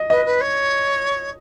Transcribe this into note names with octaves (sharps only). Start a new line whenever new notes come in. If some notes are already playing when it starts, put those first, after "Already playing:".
Already playing: D#5
B4 D#5
B4
C#5